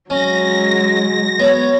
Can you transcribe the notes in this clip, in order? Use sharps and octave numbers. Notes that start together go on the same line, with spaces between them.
F#3 G#3 C#4 A#6
B3 C#5